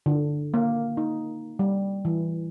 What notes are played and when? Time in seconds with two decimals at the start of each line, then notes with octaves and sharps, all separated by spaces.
0.06 D3
0.54 A#3
0.97 D#4
1.59 G3
2.05 E3